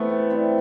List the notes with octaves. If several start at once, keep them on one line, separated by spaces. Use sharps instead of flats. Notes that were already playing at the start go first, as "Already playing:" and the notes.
Already playing: E3 A3 B3 C4
A2
E3 G3 C4